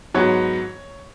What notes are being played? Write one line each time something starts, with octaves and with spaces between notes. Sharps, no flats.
G#2 F#3 B3 C#5